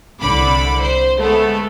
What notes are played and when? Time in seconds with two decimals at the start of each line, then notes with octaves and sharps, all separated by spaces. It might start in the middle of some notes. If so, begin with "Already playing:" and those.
0.21 C2 D3 B5 D6
0.80 C5
1.18 G#3 A3 B3 A4